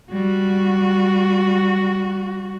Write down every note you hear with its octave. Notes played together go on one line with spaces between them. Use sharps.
G3 F#4